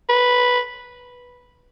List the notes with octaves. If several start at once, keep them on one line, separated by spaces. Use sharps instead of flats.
B4